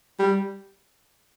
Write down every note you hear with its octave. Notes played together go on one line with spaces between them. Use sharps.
G3